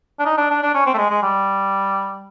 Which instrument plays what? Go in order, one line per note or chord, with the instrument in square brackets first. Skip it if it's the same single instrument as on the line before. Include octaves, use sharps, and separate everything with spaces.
[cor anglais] D4
D#4
D4
D4
D4
C#4
C4
A3
G#3
G#3
G3